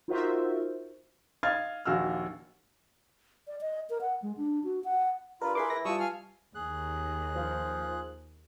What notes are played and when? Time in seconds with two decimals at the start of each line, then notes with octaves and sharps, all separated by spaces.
0.08 D#4 F4 F#4 A#4 C5 E5
1.43 D#5 F5 F6 G#6 A6
1.85 A#1 D#2 F#4 F5 E6 F6
3.47 D5
3.61 D#5
3.90 A#4
4.01 F#5
4.22 G#3
4.37 D4
4.64 F#4
4.84 F#5
5.42 G2 F4 A#4 B5
5.55 E4 G#4 A#4 B4 C6 D6
5.70 E3 A#6
5.85 G3 F4 A5 C#6 D#6 E6
6.00 F5 G#5 F6
6.55 D#2 D#3 G#4 F#6
7.35 F3